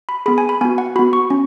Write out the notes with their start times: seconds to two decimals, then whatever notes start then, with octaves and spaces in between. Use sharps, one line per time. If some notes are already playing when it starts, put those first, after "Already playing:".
0.09 B5
0.26 B3 G#4 B5
0.38 G#5
0.49 B5
0.61 B3 G#5
0.65 F#4
0.78 F#5
0.96 F#4 B5
0.99 B3
1.13 C#6
1.30 C#4